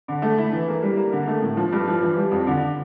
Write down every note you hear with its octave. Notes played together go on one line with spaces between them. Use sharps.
D3
A3
E4
E3
A#3
G3
A#3
D3
A3
A2
F3
G2
F3
E3
G3
F2
D3